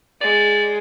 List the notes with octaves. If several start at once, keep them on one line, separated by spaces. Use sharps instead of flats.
G#3 D5